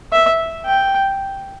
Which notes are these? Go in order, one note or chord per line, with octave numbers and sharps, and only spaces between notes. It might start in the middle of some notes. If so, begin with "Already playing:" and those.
E5
G5